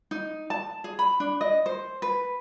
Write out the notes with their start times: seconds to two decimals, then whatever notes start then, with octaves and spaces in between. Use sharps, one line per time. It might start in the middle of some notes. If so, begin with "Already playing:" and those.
0.11 D#4
0.50 A5
0.84 G#4
0.99 B5
1.20 D4
1.41 D#5
1.66 C5
2.02 B4